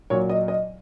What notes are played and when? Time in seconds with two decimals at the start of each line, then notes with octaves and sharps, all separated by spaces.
0.10 A#2 F#3 C#5
0.29 D#5
0.48 D#5